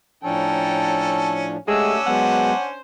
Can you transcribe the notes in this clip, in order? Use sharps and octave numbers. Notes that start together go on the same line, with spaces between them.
A2 F3 C#4 D4 A4 G5 A#5
G#3 A3 C#4 D4 G4 F#5 E6
F#3 G#3 B3 C5 F#5